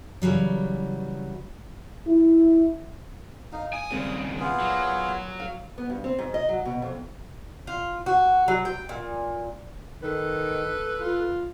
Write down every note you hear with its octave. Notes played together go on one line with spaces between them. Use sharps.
C#3 E3 F#3 G3
E4
D#4 F5
G#5 D#6
D#2 C#3 G3 G#3 C4
B3 F4 G#4
A#2 F#3
F5
B3
G2
C4
G#2
D#5
F#3
B2
F2
F4
F#4
F#3
G5
A#2
D#3 A4 B4
F4